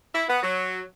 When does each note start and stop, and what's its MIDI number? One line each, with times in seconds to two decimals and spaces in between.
0.14 0.25 64
0.29 0.42 59
0.43 0.83 54